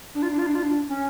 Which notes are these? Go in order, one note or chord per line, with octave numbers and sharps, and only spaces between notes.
D4
F4
D4
F4
D4
F4
D4
C#4